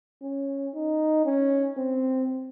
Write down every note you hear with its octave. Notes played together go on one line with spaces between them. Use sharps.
C#4
D#4
C#4
C4